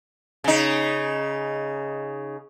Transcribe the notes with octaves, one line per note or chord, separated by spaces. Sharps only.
C#3 D#4